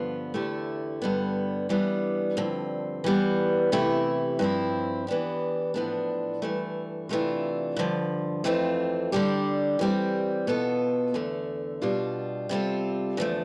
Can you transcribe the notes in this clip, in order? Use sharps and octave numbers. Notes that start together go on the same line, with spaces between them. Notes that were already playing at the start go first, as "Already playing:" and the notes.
Already playing: G2 D3 F3 B3 F4
E2 D3 A3 E4 G4
G2 D3 G3 B3
E3 G3 B3 D4
G2 D3 F3 C4
E3 G3 B3
C3 E3 A3 E4 G4
G2 F3 C4 E4
E3 B3 D4 G4
A2 F3 B3 D4
G2 E3 A3
C3 E3 A3 D4 F4
G2 D3 F3
F2 E3 A3 C4 F4
D3 G3 D4 G4
E3 G3 C4 G4
B2 B3 F4 A4
E2 D3 A3
B2 G3 D4 F4
C3 G3 C4 F4 A4
E2 D3 F3 A3